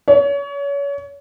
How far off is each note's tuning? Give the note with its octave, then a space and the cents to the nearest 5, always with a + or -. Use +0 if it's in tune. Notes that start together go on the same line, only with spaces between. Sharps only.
C#5 +30